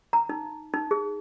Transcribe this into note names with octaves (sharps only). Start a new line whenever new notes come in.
A#5
D#4
D#4
G#4